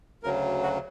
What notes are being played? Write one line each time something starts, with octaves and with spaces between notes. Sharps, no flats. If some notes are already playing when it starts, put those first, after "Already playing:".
D2 C#3 F#3 A#4
F#4